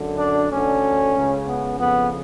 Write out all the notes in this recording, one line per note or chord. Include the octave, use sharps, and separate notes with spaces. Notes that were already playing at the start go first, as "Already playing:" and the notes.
Already playing: F#2 D3
D4
D2 D3 C#4
C#2 C#3
B3
F2 C#3 B3